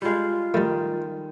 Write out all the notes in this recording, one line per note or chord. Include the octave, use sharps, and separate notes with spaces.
G3 G#3 F4
A2 D#3 G3